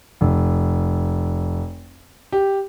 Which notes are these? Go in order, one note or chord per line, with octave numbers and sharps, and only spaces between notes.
F1
G4